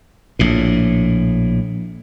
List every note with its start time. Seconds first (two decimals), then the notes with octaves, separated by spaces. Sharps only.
0.39 A#1 A2